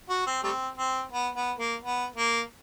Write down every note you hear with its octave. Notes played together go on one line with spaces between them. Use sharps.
F#4
C4
G3 A3 C4
C4
B3
B3
A#3
B3
A#3